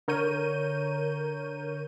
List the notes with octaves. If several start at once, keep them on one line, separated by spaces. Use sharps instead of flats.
D3 A#4 C#5 G6 D#7